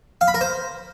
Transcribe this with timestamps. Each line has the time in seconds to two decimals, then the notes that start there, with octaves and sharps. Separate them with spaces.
0.21 F5
0.28 B5
0.34 A#4
0.41 C5